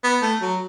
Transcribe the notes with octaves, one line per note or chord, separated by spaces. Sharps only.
B3
A3
F#3